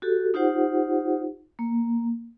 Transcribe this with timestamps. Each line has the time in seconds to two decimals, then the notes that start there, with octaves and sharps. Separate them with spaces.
0.02 F#4 G4 A4
0.34 D#4 F4 G4 C5 F#5
1.59 A#3